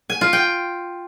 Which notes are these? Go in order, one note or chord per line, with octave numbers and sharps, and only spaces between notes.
G#5
F4
G5